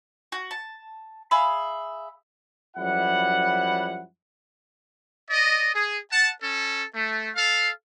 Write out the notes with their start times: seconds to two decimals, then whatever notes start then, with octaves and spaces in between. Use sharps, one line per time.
0.32 F#4
0.51 A5
1.31 G#4 E5 F5 B5
2.77 F#2 F3 G3 E4 F#5
5.30 D5 D#5
5.75 G#4
6.11 F#5 A5
6.42 C#4 A4
6.95 A3
7.36 A4 F5